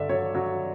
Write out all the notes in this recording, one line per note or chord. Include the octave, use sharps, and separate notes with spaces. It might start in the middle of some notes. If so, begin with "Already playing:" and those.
Already playing: G2 D3 D5 E5
F#3 C#5
F#3